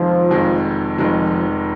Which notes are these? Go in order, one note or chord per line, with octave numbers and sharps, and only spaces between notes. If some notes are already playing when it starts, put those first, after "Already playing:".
Already playing: F1 F2 D#3 F3 G#3
F1 F2 D#3 G#3
F1 F2 D#3 F3 G#3